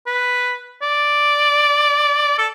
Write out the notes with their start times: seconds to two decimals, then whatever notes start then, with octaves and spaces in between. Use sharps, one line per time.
0.06 B4
0.82 D5
2.38 A4